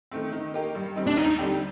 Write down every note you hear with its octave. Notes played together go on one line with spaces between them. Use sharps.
D#3 A3 C4
D#3
A#3 D#4 G4 A#4
G2
D#3 G3 C4 D#4
D4
D#2 D#4
D3 G3 C4 G4